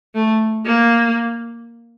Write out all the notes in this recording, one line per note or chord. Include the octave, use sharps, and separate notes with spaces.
A3
A#3